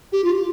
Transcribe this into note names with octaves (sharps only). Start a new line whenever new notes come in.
G4
F4